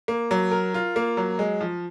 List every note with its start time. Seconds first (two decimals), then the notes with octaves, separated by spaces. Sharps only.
0.08 A#3
0.31 F#3
0.51 A#4
0.74 F4
0.96 A#3
1.17 F#3
1.39 G#3
1.61 F3